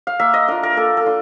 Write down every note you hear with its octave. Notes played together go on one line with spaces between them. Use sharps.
F5
A#3 E5
D#5
D4 F4 A#4
A#4
A#3 A4
A4
D4 F4